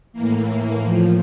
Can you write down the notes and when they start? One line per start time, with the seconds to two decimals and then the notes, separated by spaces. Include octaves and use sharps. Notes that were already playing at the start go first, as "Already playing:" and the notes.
0.13 A2 E3 A#3
0.79 A2 F3